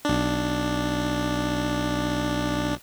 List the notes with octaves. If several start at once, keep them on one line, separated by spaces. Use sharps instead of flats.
B1 D4